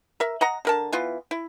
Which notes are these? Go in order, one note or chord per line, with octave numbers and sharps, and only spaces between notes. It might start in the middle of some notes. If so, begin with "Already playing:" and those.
A#4 E5
D#5 F#5 A#5
D3 A#4 A5
E3 B3 F4
E4